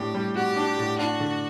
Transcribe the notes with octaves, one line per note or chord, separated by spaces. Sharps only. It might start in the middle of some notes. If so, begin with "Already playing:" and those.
Already playing: A2 D4 G4
G3
F#4 G4
D4
A2
D4 F#4
D3